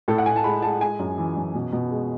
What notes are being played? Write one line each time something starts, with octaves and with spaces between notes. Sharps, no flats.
A2 A4
F#5
A2 G#5
A5
G#3 B5
G#3 A5
G#3 G#5
F#2
E3
F#2
B2
B2
G#3